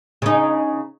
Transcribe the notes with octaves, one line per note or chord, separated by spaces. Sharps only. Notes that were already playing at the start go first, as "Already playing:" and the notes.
C#3 D#4